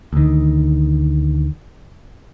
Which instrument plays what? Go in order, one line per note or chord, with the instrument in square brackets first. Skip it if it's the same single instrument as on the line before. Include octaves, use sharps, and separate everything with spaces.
[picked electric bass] D2 D#3